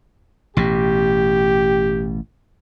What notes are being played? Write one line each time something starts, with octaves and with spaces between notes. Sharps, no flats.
A1 B2 G4